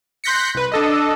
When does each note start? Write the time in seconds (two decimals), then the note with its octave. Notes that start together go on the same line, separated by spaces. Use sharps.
0.24 C6 F#6 G6 A#6 B6 C#7
0.55 C2 B4
0.72 D4 A4 D#5